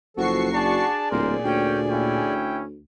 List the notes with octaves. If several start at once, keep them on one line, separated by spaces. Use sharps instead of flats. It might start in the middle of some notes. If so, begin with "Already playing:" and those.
F#1 F3 F#4 A4 C#6 C7
D4 G#4 D5 A5
D1 A#2 A#4 C5
D2 C#4 G5
C#4 E4 G5